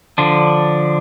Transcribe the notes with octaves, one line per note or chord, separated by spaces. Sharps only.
D3 F3 D4